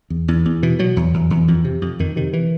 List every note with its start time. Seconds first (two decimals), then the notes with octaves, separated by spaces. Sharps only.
0.10 E2
0.28 E2
0.45 E2
0.63 B2 E3
0.79 B2 F#3
0.96 E2
1.14 E2
1.30 E2
1.48 F2
1.64 C3
1.82 F2
1.99 F2 D#3
2.16 C3 D#3
2.33 E3